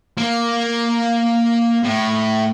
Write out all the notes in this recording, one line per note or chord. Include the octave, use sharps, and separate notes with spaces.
A#3
A2